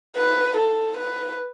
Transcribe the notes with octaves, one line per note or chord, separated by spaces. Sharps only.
B4
A4
B4